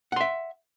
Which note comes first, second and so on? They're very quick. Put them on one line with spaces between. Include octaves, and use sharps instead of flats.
F#5 C6 E5